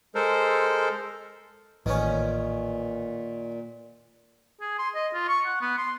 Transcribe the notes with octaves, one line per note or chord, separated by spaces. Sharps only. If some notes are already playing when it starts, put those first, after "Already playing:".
G#3 A4 A#4 C5
A1 A#2 D#3 B3 C#4
G#4
C6
D#5
F4
C#6
F#5
B3
C6